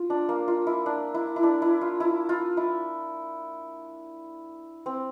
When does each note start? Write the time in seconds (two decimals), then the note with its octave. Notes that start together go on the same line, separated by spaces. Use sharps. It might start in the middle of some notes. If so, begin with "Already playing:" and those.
Already playing: F4
0.10 D4
0.29 A#3
0.48 F4
0.67 E4
0.86 D4
1.14 E4
1.36 E4
1.43 D4
1.62 E4
1.81 F4
2.00 E4
2.29 F4
2.57 E4
4.86 C4